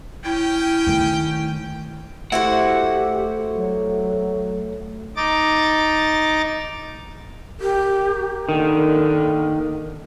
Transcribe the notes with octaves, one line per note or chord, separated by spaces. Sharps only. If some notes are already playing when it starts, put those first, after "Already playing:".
C#4 E4 G5
D#3 A3
A3 E4 F#4 G4 C5 F#5
F#3
D#4 D6 A6
G4 A#4
D3 D#3 A#3